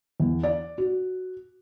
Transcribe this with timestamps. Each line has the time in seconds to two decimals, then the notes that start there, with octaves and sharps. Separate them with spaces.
0.20 E2
0.43 D5
0.78 F#4